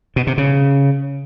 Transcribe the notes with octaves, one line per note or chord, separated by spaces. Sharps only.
B2
C3
C#3